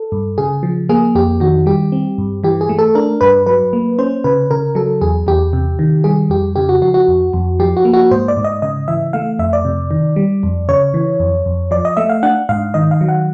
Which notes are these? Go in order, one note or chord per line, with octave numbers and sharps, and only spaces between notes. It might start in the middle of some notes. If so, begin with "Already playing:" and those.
Already playing: A4
G2
C#3 G#4
F3
A#3 G#4
F2 G4
D#3 F#4
G3 G4
C4
G2
E3 G4
G#4
A3
A4
D4 A#4
G2 B4
F#3 B4
A#3
C#4 C5
C#3 B4
C#3 A#4
F#3 A4
E2 G#4
E2 G4
C3
D#3
G3 G#4
F2 G4
C#3 G4
F#4
F3 F#4
F#4
F2
F2
F3 G4
F#4
A#3
F#4
G#2 C5
D5
G#2
D#5
C#3 D#5
E3 E5
A3 F5
F2 E5
D5
C3
D#3
G3
F2
C#3 C#5
E3
F2
F2
F3 D5
D#5
A3 E5
F5
D4 F#5
G#2 F5
D#3 D#5
F5
F#3
F#5